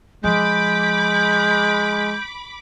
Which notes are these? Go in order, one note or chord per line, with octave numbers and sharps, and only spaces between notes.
F3 G#3 B5 D6 G6